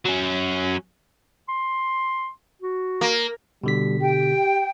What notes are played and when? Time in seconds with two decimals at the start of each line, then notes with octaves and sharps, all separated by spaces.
0.05 F#3 C#4
1.49 C6
2.62 F#4
3.01 A#3
3.64 B2 D3 G3 B6
4.00 G4 G5